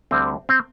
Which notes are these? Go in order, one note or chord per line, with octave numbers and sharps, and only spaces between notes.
D2 D3 G3 C4
C4